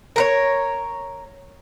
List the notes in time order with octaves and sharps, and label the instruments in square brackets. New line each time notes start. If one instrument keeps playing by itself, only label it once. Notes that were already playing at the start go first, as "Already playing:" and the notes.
[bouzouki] A#4 B4 C#5